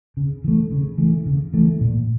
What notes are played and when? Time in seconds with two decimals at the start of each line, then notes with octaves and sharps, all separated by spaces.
0.17 C#3
0.44 E3 A3
0.71 C#3
0.98 E3 A3
1.26 C#3
1.54 E3 A3
1.81 A#2